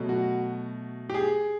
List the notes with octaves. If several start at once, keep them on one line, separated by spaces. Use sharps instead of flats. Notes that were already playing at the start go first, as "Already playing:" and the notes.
Already playing: B2 F#3 A3
F#4
G4
G#4